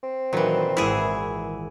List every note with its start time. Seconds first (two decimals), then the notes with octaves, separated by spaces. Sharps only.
0.03 C4
0.33 A#2 D#3 E3 F#3
0.77 G#1 E3 E4 G#4